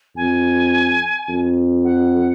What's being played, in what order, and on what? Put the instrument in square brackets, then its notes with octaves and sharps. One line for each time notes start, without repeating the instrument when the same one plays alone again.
[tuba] F2 [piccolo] G#5
[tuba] F2
[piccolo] F#5